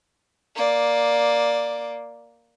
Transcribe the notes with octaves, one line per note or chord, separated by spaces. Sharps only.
A#3 D5